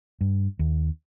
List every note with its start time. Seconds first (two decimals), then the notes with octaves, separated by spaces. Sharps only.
0.21 G2
0.59 D#2